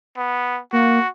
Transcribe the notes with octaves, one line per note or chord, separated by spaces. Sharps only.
B3
A#3 F#4